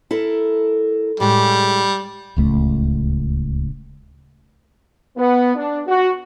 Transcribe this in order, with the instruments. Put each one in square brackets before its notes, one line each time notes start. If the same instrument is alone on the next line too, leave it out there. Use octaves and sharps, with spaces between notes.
[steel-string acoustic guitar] E4 A4 A#4
[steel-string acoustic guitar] A2 G#3 [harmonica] G3
[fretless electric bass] D1 C#2 A3
[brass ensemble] B3
D4
F#4